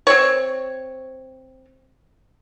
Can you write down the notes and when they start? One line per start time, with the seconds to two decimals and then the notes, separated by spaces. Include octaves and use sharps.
0.07 C4 C#5